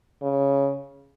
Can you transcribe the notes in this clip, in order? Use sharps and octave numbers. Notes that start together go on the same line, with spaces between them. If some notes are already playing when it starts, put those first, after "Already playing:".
C#3